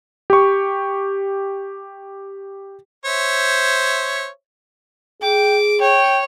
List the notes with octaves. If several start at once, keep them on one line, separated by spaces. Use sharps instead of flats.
G4 C#6
C5 C#5 E5
G#4 G5 D6
C#5 G5